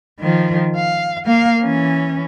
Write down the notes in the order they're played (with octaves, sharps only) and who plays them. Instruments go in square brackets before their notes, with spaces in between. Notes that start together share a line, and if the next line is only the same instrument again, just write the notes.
[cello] D#3 F3
F5
A#3 F5
E3 C#4